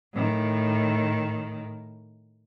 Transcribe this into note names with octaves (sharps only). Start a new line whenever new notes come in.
A2 D#3